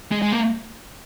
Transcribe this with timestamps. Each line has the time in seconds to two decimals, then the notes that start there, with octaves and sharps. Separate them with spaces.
0.11 G#3
0.22 G#3
0.32 A#3